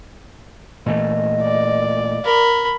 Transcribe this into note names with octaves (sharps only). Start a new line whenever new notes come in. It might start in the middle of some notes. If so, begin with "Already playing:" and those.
A#2 E3 A3 D#5
D5
A#4 B5